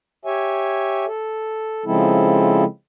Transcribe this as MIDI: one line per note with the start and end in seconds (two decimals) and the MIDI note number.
0.25 1.05 67
0.25 1.05 73
0.25 1.05 76
0.25 1.05 80
1.07 1.85 69
1.86 2.64 49
1.86 2.64 53
1.86 2.64 56
1.86 2.64 60
1.86 2.64 64
1.86 2.64 69